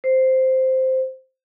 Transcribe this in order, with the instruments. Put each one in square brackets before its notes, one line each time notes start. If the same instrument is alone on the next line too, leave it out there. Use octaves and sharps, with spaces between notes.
[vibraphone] C5